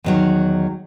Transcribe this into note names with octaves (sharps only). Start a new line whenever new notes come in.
E2 D#3 F#3